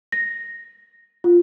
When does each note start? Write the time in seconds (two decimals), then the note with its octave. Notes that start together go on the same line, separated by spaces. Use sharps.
0.12 A#6
1.24 F4